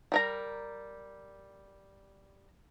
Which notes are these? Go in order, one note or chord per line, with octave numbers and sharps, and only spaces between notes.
G3 A#4 A#5